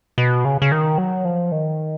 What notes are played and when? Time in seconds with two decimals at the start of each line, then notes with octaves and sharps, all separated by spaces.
0.18 B2
0.45 C#3
0.62 C#3
0.72 D#3
0.98 F#3
1.25 F3
1.52 D#3